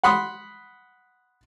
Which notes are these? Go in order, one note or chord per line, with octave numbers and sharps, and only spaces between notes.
F#5 B5 C6 D#6